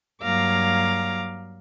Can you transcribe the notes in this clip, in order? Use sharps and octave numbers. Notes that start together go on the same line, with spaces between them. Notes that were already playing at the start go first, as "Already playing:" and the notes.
G2 F#3 A#3 F5 A#5 D6